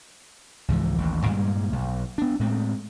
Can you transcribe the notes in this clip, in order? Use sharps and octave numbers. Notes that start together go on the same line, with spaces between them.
C#2 G#2 E3 F3
A1 D#2
G2 A#2 G3 G#3
B1
B3 D4
A2 G#3 A3 C4